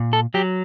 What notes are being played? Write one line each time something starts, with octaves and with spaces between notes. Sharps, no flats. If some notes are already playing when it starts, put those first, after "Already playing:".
Already playing: A#2
A4
F#3 G4